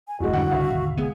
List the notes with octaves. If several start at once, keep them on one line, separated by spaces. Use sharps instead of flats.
G#5
D1 G1 F2 A2 G#3 F#4
G#1 F2 D3 G3 D4 E4 F#5
C#2 G2 C#3 E5 F5
G#1 D#2 B2 D3
C3 G#3 B3 G#4